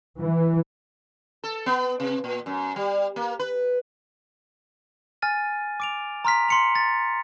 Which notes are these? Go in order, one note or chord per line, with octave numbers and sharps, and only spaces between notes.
E3
A4
B3
C3
A#2
F#2
G3
A#3
B4
G#5 F6 A6 D#7
D6 D7 F7
A#5 C6 F6 B6
C6 C#7 F7
A6